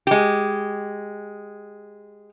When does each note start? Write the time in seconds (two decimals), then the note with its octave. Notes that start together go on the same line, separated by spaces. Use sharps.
0.07 G#3 G4